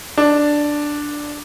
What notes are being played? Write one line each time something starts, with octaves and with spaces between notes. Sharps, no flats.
D4